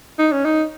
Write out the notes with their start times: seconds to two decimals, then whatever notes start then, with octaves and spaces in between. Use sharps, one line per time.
0.19 D#4
0.32 C#4
0.45 D#4